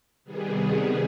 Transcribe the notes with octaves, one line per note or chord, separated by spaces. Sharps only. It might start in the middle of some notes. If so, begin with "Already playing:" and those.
C3 D#3 G3 B3 G#4